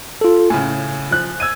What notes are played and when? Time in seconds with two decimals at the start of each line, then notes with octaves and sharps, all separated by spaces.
0.21 F4 A4
0.50 A2 C#3 G#5
1.11 F3 F#6
1.40 E6 G#6 D#7